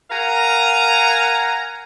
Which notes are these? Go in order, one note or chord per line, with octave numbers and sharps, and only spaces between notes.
A#4 F5 F#5 G#5 A#5